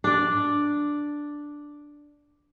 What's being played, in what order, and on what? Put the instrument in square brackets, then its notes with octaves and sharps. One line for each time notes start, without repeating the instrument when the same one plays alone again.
[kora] D4 D5